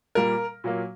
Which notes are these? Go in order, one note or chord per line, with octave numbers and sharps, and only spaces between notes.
A#2 G3 A#3 A#4
A#2 F#3 A#3